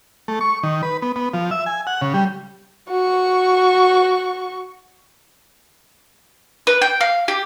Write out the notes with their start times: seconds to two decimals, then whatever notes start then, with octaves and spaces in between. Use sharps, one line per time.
0.28 A3
0.41 C#6
0.63 D#3
0.83 B4
1.02 B3
1.16 B3
1.34 F3
1.51 E5
1.66 G#5
1.87 F#5
2.01 C#3
2.14 G3
2.89 F#4 C#6
6.67 B4
6.82 G5
7.01 F5
7.28 G4